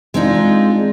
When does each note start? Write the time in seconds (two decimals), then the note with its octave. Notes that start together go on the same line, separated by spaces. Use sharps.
0.14 G#3 C4 D4 D#4 F4